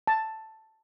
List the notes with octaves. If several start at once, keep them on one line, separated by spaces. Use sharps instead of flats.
A5